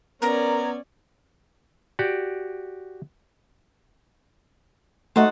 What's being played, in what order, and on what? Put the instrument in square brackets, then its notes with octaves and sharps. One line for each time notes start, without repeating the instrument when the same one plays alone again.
[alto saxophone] B3 [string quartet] C#4 D5 G#6 [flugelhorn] A#4 [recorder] A#5
[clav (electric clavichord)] F#4 G4 D5
[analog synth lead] A3 [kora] D#4 F#4 C5 [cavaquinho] A4 F#5